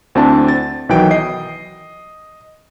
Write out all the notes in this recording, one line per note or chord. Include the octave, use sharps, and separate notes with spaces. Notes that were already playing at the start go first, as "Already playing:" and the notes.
D2 C4 D4 E4 A5
A6
B1 D#3 E3 F#3 G5 D7
D#5 C7